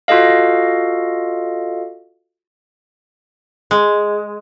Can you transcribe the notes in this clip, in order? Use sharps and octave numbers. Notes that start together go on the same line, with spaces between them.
F4 F#4 A4 D#5 F5
G#3